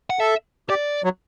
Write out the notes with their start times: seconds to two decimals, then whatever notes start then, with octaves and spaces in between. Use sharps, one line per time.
0.10 F#5
0.19 A4 E5
0.70 G4 D5
1.04 F#3